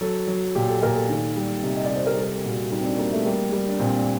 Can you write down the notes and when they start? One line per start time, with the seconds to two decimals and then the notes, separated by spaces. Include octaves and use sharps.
0.01 F#3 A4
0.28 F#3
0.55 A#2 G4
0.68 A4
0.82 A#2 A#4
0.95 A4
1.09 D#3
1.37 G3
1.63 C3
1.75 D#5
1.86 D5
1.91 C3
1.96 C5
2.06 A#4
2.17 G3 A4
2.44 A#2 F#4
2.71 G3 D#4
2.79 C4
2.85 D4
2.98 G3 A#3
3.12 A3
3.25 G3 A#3
3.52 G3
3.68 D4
3.79 A#2 C4